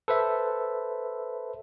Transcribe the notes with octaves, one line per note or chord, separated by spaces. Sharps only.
A4 B4 C5 E5